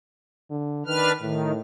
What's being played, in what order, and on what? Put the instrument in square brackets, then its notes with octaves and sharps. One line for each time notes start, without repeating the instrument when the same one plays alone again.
[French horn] D3
[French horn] D#3 [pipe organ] D4 B4 F6
[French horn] A2 [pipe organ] D#3